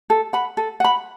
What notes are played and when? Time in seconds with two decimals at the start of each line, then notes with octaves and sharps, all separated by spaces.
0.10 A4
0.33 F#5 B5
0.57 A4
0.80 F#5 B5